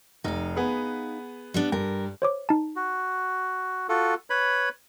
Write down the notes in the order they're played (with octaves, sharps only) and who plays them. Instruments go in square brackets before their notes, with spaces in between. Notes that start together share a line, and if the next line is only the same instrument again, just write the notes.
[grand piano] F1 [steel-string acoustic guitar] D#4 F5
[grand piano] B3 G#4 B4
[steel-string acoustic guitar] G3 B3 D4
[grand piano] G2 [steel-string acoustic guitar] A#4
[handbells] C5 C#5 D6
D#4 A5
[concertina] F#4
F4 F#4 A4
B4 C#5 B5